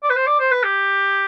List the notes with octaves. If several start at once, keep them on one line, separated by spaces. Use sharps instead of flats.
D5
B4
C5
D5
C5
B4
G4